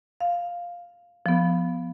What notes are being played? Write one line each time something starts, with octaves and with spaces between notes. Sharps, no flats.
F5
F3 B3